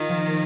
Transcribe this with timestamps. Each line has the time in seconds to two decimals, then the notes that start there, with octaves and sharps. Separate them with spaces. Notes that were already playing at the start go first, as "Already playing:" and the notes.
Already playing: D#3 F4
0.09 F3
0.23 A#3